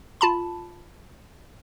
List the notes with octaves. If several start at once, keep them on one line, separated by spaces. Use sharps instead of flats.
F4 A5 B5